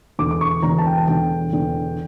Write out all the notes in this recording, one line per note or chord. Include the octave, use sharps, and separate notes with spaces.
E1 E2 D3 D6
D6
C#6
E1 E2 D3 A#5
A5
G5
A5
E1 E2 D3 G5
E1 E2 D3